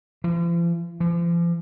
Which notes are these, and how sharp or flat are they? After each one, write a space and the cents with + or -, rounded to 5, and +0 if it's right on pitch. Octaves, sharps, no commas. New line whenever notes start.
F3 -45
F3 -40